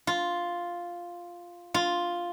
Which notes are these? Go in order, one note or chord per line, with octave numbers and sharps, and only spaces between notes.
F4
F4